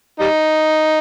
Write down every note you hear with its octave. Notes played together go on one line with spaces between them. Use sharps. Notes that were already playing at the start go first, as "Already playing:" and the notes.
G3 D#4